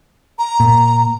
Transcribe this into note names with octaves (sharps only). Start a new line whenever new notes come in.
A#5
A#2